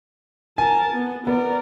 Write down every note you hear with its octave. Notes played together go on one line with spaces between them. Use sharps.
A#4 G#5 A5
B3
B3 A#4 D5